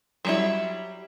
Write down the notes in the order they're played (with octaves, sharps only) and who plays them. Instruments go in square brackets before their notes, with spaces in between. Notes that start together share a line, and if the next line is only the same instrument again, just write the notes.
[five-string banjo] F#3 G3 E4